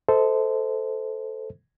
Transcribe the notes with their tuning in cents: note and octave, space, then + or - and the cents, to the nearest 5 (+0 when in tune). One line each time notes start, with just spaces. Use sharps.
A4 +0 C5 -15 D#5 +35